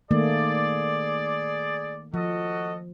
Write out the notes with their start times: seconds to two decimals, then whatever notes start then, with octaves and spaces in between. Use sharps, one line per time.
0.11 D#3 A3 A#3 G#4 D5
2.14 F3 F#4 A4 D#5